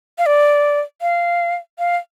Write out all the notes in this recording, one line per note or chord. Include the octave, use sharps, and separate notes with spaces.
F5
D5
F5
F5